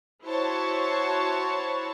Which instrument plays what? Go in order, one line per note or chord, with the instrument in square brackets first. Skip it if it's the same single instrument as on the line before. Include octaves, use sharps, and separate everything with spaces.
[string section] E4 F#4 C5 C#5 A5 C#6